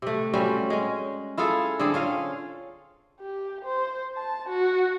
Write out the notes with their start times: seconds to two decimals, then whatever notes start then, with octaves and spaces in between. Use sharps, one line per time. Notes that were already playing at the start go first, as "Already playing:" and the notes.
0.02 C3 A3
0.34 G3 C4 C#4 F#4
0.70 G#3 C#4
1.37 E4 F4 G#4 A4
1.79 D3 C4 G#4 A4
1.94 C#4 F4 F5
3.20 G4
3.65 C5
4.17 A5
4.49 F#4